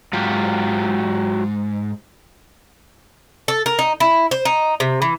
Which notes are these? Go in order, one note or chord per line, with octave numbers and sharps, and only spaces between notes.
G#2 F#3 F4 G4
A4
A#4
D#4
E4
C5
D#4
C3
E3